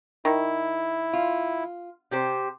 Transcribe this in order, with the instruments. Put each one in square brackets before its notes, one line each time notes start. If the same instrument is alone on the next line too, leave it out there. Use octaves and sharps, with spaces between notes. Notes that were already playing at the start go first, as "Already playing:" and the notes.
[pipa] D#3 [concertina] E4
[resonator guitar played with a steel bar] F4
C3 G4 C5